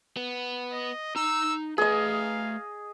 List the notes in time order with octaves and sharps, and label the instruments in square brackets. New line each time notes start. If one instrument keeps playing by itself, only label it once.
[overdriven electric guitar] B3
[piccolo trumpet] D#5
[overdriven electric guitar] D#4 A#5 [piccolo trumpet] E6
[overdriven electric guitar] A3 B4 [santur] G#4 D#5 [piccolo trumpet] F5